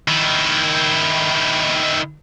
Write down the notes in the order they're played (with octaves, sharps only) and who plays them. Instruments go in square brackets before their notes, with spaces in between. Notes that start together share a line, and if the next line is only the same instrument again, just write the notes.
[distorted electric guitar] D#3 E4